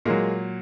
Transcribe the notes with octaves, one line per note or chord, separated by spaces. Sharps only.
A#2 F#3 G#3 A#3